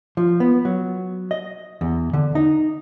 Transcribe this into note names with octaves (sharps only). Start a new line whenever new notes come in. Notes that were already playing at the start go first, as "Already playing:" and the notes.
F3
B3
F#3
D#5
E2
D3
D#4